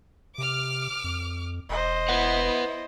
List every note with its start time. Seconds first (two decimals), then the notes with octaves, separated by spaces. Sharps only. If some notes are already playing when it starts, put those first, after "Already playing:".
0.38 C3 D6 F6
1.04 F2
1.69 E1 C5 D#5
2.09 E4 B4 F#5